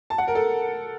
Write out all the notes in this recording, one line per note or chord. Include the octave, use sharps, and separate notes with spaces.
A5
F#5
A#4
A4